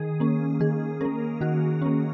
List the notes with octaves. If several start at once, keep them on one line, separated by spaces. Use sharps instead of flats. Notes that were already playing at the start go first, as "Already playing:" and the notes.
Already playing: D#3 G#4
A#3 C#4
D#3 G#4
A#3 C#4 A#4
D#3 F#4
A#3 C#4